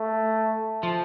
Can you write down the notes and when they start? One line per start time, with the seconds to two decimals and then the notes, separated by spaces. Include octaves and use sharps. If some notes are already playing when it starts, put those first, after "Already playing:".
Already playing: A3
0.83 F3